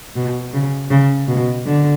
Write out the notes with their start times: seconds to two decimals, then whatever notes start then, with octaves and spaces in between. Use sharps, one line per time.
0.16 B2
0.54 C#3
0.91 C#3
1.28 B2
1.66 D3